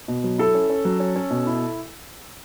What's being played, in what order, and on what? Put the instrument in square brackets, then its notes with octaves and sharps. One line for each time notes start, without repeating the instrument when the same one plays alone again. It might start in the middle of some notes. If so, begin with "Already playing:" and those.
[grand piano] B2
F#3
[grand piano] E4 [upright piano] A4
[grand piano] C#4
C#4
F#3
C#4
C#4
B2
E4